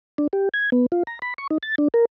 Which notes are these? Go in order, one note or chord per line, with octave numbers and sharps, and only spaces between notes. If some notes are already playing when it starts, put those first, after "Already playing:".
D4
G4
G#6
B3
F4
A#5
B5
C#6
D#4
A6
D4
A#4